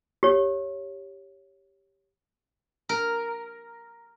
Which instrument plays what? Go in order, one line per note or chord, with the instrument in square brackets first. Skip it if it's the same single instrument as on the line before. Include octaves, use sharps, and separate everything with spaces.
[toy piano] G4 C#5
[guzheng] A#4